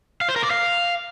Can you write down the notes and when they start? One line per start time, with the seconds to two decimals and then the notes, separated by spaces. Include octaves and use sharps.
0.21 F5
0.29 C5
0.36 A#4
0.43 D5
0.51 F5